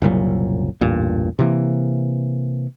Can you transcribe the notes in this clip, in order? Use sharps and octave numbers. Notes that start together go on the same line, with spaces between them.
F#1 C2 A#2 F#3
A1 E2 G2 A#2
C3 E3 A#3